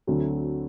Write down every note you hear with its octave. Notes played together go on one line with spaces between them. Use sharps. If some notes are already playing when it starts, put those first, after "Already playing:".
D2 D3 F#3 A3 C4